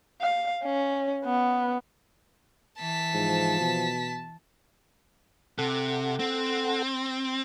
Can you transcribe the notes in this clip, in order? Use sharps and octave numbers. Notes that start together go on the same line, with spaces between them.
F5
C#4
B3
E3 A5 B6
G#2 F3
B2
C3 A4 F#5
C4